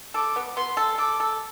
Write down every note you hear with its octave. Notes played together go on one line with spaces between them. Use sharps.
A4 D6
B3
B3 C6
A4
A4 D6
A4